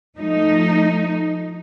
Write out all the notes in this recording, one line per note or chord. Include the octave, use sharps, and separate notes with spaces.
F3 A3 D#4